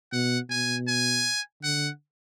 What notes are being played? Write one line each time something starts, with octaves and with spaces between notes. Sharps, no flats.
B2 F#5
B2 G#5
G#5
D3 F#5